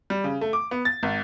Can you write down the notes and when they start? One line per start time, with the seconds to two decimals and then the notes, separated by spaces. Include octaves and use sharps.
0.10 G3
0.24 C#3
0.41 A3
0.53 D6
0.71 B3
0.85 A6
1.03 G#1